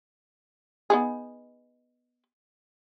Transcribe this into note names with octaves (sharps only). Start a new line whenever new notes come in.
B3 D#4 G#4